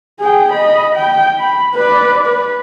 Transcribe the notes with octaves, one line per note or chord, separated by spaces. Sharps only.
G#4 G5
D#5 B5
G5
B5
B4 D5
B4